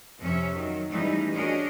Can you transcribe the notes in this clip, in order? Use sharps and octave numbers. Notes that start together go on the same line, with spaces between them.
F2 C3 C#4 E5
D#3 F#3
C#3 E3 G3 A3 D#4
C#4 D4 F#4 G#4 A#4 D#5